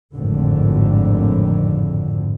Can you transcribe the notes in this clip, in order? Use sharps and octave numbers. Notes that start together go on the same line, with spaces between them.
G#1 F2 A2 D3